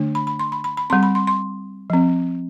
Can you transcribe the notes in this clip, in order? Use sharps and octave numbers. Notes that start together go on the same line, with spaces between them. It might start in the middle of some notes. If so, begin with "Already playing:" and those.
Already playing: D3 A3 D4
B5
B5
C6
B5
B5
B5
G3 C4 C6
B5
C6
C6
F3 C4